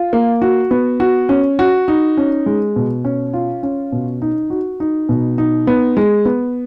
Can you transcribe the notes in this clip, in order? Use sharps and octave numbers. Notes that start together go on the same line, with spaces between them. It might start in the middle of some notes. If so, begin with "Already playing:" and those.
Already playing: F4
A#3
F#4
B3
F#4
C#4
F#4
D#4
C#4
G#3
B2
C#4
F4
C#4
B2
D#4
F#4
D#4
B2
D#4
B3
G#3
B3